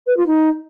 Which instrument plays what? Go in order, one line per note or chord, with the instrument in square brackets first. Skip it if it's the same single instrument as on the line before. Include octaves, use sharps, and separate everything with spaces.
[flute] B4
F4
D#4